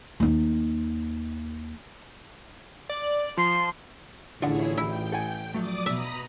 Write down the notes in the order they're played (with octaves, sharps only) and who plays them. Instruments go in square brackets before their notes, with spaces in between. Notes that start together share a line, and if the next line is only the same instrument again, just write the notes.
[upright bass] D#2 D#4
[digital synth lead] D5
[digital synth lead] F3 [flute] C6
[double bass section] A1 [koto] D3 [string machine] E4 G#4 C#5 [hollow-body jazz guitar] F4 D5 F#5
[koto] E4 [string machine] G5
[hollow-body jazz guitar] A4 F#5 G#5
[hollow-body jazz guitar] F3 F#3 A3 [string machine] D5 D6 D#6
[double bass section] B2 [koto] E5 [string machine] A#5 B5 D#6